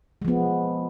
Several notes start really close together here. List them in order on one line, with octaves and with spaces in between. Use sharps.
G#3 F3 B3